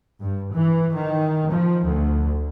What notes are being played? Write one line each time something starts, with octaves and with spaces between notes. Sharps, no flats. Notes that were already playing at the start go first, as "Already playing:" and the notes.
G2
E3
D#3
F3
D2